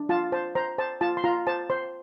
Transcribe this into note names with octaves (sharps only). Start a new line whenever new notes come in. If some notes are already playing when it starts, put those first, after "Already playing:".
Already playing: D4
F4 A5
C5 A5
C5 A#5
C5 A5
F4 A5
C6
F4 A#5
C5 A5
C5 C6